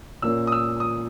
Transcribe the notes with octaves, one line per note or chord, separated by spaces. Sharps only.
A#2 A#3 C#4 E6
D#6
E6
D#6